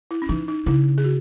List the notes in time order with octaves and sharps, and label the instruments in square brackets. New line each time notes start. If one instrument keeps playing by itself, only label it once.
[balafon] E4
C#4
[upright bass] E3 [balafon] D#4
[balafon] D#4
[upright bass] C#3 [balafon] E4
[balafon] G#4
F#4